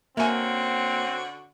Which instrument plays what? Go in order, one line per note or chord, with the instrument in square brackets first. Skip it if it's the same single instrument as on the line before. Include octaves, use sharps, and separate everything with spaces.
[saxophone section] D3 C#4 F#4 [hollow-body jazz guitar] A#3 [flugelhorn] C4 [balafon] E5 G#5